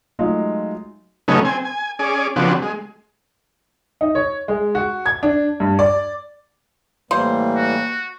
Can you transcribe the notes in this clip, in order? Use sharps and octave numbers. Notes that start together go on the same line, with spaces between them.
F#3 G#3 A3 D#4 F4
C#3 F#3 A3 B3 C#4 D#4
C4 G#5
G#5
C#4 G#4 D5
C#3 F3 B3 C4 D4 F#4
G#3
D#4
C#5
G#3
F#4
G#6
D4
G2
D5
A2 E3 G3 A#3 C5
F#4